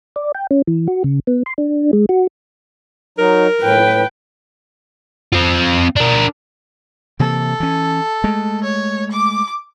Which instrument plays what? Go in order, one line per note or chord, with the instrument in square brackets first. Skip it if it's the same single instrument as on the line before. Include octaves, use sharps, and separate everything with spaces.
[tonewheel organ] D5
G5
C#4
E3
F#4
C#3
B3
C6
D4
G#3
F#4
[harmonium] F#3 D#4 [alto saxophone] A#4
[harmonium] A2 [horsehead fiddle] B4 G5
[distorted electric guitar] C4 F4
D4 A#4
[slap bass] C3 E3 A#3 [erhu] A4
[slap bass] E3 C#4
G#3 A3
[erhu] C#5
D6